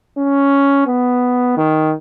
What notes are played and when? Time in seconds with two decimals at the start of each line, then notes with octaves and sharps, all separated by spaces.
0.18 C#4
0.87 B3
1.57 D#3